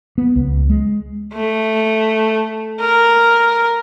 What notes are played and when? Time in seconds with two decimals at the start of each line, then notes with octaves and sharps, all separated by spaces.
0.18 B3
0.36 C#2
0.70 G#3
1.34 A3
2.80 A#4